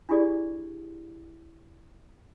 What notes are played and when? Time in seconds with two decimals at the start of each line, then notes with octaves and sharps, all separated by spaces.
0.09 D4 E4 F4 G4 G#4 D5